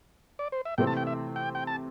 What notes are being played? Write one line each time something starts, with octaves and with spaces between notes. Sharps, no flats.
D5
C5
E5
C3 E3 A3 C4 G5
A5
G5
E5
G5
G5
A5